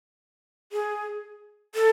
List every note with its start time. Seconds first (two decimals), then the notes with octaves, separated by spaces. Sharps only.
0.72 G#4
1.75 A4